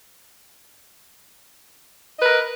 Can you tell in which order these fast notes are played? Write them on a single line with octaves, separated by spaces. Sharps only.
D#5 B4 A#4